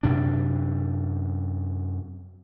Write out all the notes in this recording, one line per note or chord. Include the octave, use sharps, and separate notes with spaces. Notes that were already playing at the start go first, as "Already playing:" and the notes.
F#2 C3 D4